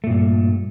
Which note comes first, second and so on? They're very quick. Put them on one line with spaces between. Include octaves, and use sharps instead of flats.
A3 A#2 G2